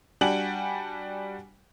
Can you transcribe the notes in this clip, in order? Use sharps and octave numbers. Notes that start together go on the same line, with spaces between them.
G3 D4 F#4 G5 G#5 F#7